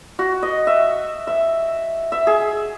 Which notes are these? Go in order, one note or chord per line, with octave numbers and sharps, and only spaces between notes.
F#4
D#5
E5
E5
E5
G#4